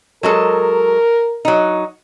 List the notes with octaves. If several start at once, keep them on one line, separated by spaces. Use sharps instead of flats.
F#3 G#3 A4 A#4
F#3 D#4